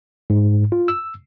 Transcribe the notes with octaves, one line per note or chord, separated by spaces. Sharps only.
G#2
F4
E6